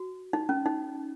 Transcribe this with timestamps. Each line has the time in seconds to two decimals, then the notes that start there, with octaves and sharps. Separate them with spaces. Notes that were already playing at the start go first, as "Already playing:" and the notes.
Already playing: F#4
0.33 D#4
0.49 C#4
0.66 D#4